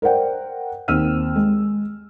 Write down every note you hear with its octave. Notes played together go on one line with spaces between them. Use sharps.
A#4 C5 D5 F#5 G5
D#2 C4 E6 F6 D#7
G#3